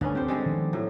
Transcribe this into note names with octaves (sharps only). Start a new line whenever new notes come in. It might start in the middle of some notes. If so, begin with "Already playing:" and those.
G1 D2 D3 B3 C#4
C4 G4 C5
D3 G3 G#3
D#3 F3 B3
A2 F#3